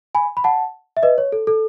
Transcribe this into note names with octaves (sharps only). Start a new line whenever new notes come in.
G#5 B5
B5
F#5 A5
E5
B4 D#5
C#5
A4
A4